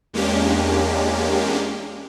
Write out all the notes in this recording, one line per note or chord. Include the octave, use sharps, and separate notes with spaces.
E2 G#3 A#3 C#4 D4 G4